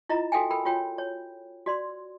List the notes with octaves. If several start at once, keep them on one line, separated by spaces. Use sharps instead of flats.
E4 F4 D#5 A#5
F#4 A4 E5 G5 G#5
A4 A#4 G5 B5
F4 F#4 C#5 G5
C#5
F#4 D5 C6